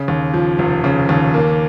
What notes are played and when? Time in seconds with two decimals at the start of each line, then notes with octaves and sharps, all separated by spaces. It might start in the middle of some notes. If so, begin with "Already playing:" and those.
Already playing: C#3
0.08 D#2
0.34 F3
0.59 F1
0.84 C#3
1.09 D#2
1.34 A#3